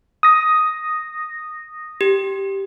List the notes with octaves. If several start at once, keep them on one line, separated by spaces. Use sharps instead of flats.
D#6 A#6
G4